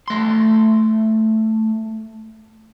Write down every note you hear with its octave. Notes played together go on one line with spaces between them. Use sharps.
A3 C6